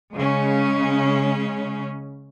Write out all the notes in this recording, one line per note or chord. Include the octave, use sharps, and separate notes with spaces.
C#3 G#3 C#4